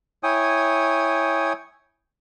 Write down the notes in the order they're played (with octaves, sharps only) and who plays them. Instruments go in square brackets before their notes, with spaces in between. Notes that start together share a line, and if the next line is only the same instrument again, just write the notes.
[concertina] E4 C#5 G5 G#5 D#6